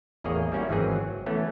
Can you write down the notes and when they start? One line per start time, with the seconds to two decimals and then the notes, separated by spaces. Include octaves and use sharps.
0.24 A1 E2 A#3 G#4 C#5 D#5
0.52 G3 A#3 C#4 E4 F#4
0.69 G#1 D#3 E3 F#3 C4 G#4
0.96 F#3
1.26 E3 A3 B3 C#4